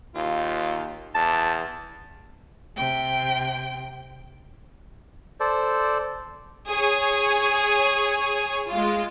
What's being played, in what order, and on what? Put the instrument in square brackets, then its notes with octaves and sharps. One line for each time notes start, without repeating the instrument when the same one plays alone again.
[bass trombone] D#2 [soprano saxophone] F4
[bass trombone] E2 [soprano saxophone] A5
[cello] C3 G5
[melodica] A4 C5 D5
[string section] G#4 C#5 G#5
G#3 F4